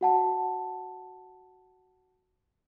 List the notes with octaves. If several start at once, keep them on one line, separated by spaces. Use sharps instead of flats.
F#4 F#5 A5